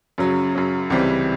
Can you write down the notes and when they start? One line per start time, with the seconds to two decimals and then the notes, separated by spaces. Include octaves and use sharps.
0.18 F#2 C#3 F#3
0.55 F#2 C#3 F#3
0.90 C#2 C3 E3 G3 C4